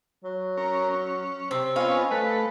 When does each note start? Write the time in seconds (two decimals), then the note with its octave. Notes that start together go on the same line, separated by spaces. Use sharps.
0.24 F#3
0.57 C#4 A#4
0.93 C#4
1.51 C3 C4
1.76 B3 C#4 F4 D#5 F5 G#5
2.11 A3 B4